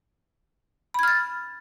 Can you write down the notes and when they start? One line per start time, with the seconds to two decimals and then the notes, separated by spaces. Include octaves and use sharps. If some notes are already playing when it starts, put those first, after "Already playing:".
0.94 B5
0.99 G#6
1.03 F6
1.08 A6